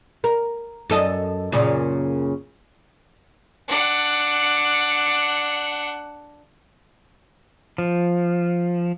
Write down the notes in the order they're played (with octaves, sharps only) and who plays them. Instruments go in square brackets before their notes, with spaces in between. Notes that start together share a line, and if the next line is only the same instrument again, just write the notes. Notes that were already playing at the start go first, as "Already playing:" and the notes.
[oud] A#4
F#2 A4 D#5
F#2 A#2 C#3
[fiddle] D4 F#5
[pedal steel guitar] F3